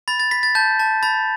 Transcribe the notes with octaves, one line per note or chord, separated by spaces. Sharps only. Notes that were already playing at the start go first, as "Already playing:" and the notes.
B5 A6
A6
B5 B6
A6
A5 G6
A5
B5 A6